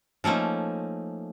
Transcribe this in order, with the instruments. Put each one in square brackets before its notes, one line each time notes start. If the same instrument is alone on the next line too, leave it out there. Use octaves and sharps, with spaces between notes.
[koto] F3 A3 A#3 C#4 D#4